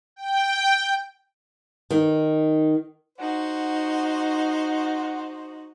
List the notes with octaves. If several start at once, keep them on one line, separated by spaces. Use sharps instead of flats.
G5
D#3
D#4 F#4 C5 F#5